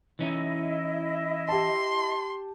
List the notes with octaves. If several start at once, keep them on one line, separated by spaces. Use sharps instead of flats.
E3 C#4 D#4 E4 D#5
G4 A5 C6